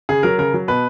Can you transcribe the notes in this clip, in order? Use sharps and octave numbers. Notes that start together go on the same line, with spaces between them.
C#3 G#4
F#3 A#4
C#3 A#4
F#3
B2 B4